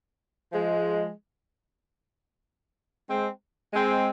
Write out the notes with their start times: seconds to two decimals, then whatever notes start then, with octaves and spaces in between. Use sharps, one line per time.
0.53 F3 G#3
3.09 G#3 C4
3.73 G#3 C4